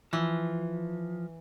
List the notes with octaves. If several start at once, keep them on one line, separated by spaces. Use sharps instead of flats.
E3 F3